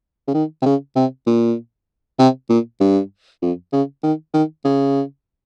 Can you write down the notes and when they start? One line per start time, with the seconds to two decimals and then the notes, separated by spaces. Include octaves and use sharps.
0.28 C#3
0.34 D#3
0.62 C3
0.66 C#3
0.96 C3
1.27 A#2
2.19 C3
2.50 A#2
2.81 G2
3.42 F2
3.73 C#3
4.03 D#3
4.34 D#3
4.65 C#3